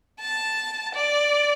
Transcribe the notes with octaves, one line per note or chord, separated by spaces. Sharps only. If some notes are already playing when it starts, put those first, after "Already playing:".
A5
D5